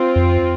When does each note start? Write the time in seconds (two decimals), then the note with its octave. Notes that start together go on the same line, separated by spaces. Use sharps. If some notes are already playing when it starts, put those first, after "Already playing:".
Already playing: C4 F4
0.16 F2